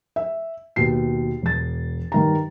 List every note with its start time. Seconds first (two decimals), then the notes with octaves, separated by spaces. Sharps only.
0.16 E5
0.76 D#2 B2 C7
1.42 E1 A6
2.12 G2 D#3 A#5